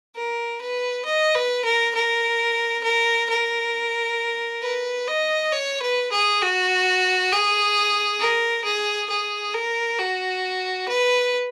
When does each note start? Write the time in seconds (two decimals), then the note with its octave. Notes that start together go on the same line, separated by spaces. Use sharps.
0.16 A#4
0.61 B4
1.06 D#5
1.35 B4
1.65 A#4
1.95 A#4
2.84 A#4
3.30 A#4
4.63 B4
5.08 D#5
5.52 C#5
5.82 B4
6.12 G#4
6.42 F#4
7.32 G#4
8.20 A#4
8.64 G#4
9.10 G#4
9.54 A#4
9.99 F#4
10.88 B4